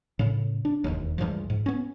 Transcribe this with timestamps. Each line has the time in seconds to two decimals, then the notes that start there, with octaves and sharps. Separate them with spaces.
0.19 A2 C#3
0.65 D4
0.84 E1 A#1 D#2
1.18 C#2 G2 E3 F3
1.50 G#2
1.66 B3 C#4